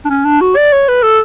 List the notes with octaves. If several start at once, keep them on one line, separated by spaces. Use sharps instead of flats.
D4
C#4
D4
F#4
D5
C#5
B4
A4